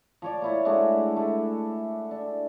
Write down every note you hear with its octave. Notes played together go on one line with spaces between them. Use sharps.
F3 C#5 D5
A#3 E4 C#5
G#3 A3 D4 F#4
A3
D4